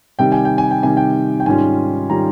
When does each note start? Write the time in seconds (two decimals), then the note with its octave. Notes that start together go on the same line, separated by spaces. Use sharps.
0.19 C3 D#3 G3 G5
0.32 G#5
0.45 G5
0.58 G#5
0.71 G5
0.83 C3 D#3 G3 G#5
0.97 G5
1.40 G5
1.46 G#2 D#3 G3 C#4 F4 G#5
2.10 D#3 G3 C#4 F4 A#5